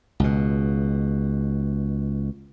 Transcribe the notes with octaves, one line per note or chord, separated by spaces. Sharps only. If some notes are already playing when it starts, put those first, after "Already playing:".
C#2 B2